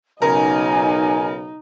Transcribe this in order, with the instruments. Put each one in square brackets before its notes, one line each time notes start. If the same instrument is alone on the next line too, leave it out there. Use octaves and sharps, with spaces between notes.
[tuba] B1 [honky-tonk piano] C#3 A#4 [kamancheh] D#4 [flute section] G#5